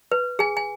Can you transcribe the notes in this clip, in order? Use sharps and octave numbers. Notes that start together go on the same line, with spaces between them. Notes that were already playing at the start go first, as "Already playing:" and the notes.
B4
G#4 G#5
G#5